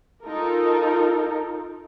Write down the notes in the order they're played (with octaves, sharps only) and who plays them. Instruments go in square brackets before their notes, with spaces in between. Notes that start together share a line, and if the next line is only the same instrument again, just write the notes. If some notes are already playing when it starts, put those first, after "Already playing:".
[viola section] D#4 F4 A4 A#4